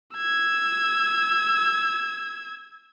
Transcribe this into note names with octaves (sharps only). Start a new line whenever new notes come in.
E6 G#6